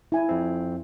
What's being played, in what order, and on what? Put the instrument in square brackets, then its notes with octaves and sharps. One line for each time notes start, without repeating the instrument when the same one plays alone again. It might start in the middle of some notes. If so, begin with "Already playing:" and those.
[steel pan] E4 G#5
[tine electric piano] F2 C4